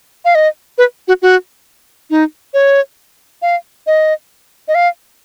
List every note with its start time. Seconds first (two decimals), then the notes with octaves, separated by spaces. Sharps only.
0.25 F5
0.35 D#5
0.78 B4
1.08 F#4
1.22 F#4
2.10 D#4
2.54 C#5
3.42 F5
3.87 D#5
4.68 D#5
4.75 F5